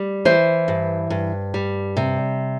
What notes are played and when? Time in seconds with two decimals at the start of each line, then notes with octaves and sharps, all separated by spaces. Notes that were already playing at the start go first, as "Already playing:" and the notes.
Already playing: G3
0.25 E3 C5
0.68 G2
1.10 G2
1.54 G3
1.97 C3